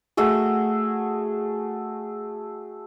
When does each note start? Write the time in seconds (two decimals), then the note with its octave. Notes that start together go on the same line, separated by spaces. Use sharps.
0.17 A3 F#4 G#4